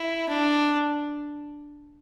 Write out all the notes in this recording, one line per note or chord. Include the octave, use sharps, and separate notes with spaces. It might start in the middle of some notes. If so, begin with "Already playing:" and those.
Already playing: E4
D4